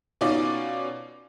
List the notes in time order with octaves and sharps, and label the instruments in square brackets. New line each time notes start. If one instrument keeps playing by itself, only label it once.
[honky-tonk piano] B2 C#4 D#4 F4 D5 D6